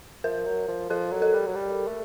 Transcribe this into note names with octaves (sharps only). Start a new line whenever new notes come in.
F3 A#4
F#3
F3
F3 A4
F#3
A4
G3
F#3
G3
A3